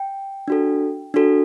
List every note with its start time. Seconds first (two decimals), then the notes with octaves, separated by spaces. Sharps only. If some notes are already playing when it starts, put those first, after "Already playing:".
Already playing: G5
0.48 D4 F#4 A4
1.14 D4 F#4 A4